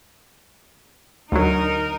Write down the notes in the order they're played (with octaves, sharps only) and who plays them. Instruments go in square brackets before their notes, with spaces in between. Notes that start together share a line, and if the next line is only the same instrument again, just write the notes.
[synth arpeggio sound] D2 F#3 [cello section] D#4 A#4